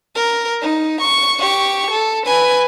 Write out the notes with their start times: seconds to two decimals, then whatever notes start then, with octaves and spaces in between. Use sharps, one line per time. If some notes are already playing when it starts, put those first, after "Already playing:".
0.15 A#4
0.62 D#4
1.01 C#6
1.39 G4 C#6
1.91 A4
2.26 B4 G#5